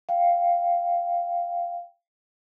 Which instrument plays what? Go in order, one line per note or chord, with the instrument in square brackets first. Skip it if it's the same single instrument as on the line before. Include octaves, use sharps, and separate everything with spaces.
[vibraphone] F5 G5